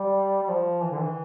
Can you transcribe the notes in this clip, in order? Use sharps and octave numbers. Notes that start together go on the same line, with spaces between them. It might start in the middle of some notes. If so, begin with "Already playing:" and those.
Already playing: G3
G3
F3
E3
D3
E3